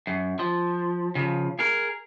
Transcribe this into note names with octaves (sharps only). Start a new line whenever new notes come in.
F#2
F3
C#3 F3
G#4 A#4